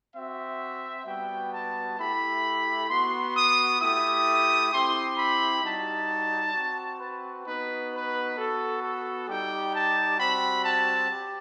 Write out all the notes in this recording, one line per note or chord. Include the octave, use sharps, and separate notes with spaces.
C4 F#4 E5
G3 B3 F#4 G5
A5
A3 E4 G4 B5
B3 F#4 C6
D#6
A3 E4 G4 D#6
C4 E4 G4 C6
B5
G3 D#4 F#4 A5
C4 F#4
B4
B3 D#4 F#4 B4
B4
B3 F#4 A4
A4
G3 D#4 G4 G5
A5
G3 C4 F#4 B5
A5
G4